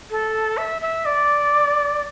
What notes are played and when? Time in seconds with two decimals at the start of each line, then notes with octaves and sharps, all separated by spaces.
0.11 A4
0.57 E5
0.82 E5
1.05 D5